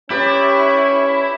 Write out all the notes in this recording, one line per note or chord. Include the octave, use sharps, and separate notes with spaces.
C#4 E4 G4 B4 D5